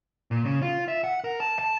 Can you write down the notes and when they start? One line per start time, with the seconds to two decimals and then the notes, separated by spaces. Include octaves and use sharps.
0.31 A#2
0.45 C#3
0.62 F4
0.88 E5
1.04 F#5
1.24 A#4
1.40 A5
1.59 A5